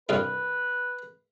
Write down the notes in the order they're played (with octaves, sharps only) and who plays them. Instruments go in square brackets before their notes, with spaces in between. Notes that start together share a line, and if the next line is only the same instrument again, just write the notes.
[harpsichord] C2 G2 F4 [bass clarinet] B4